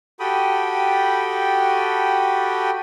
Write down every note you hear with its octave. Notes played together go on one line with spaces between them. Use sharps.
F#4 G4 A4 G5 B5 D#6